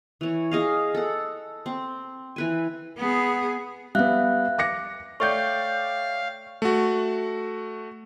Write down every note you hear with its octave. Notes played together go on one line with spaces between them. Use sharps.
E3 C#5
G#4 D#5 F5
A4 F#5
C4
E3 B4 G#5
B3 G#4
G3 B3 E5 F5 F#6
D6 A#6 C#7
A3 C#5 D5 F5 G5 C#6 G6
A3 F#4